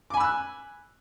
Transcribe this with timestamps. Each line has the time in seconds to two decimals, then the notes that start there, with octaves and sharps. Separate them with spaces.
0.10 D6
0.14 G#5
0.17 B5
0.20 E6
0.24 F#6